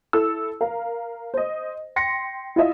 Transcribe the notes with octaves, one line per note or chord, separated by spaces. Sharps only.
E4 A4 E6
A#4 F5
C5 D#5
G5 C6 A#6 C#7
E4 F4 D#5 E5